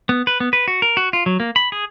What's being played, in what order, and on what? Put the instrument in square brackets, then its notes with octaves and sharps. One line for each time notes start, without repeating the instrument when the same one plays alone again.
[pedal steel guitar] B3
B4
B3
B4
F#4
A#4
F#4
F4
F#3
A#3
B5
G#4